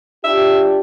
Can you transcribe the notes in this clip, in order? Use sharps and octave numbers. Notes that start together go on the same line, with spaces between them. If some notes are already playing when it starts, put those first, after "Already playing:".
D4 F4 G4 E5